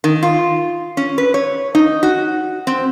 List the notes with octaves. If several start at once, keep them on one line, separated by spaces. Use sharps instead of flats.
D#3
F4
C#4
B4
C#5
D#4
F#4
C4